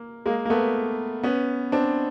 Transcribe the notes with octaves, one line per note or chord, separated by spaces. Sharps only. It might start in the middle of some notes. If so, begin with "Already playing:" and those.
Already playing: A#3
G#3 A#3
A#3
A3 B3
B3 C#4
C4 D4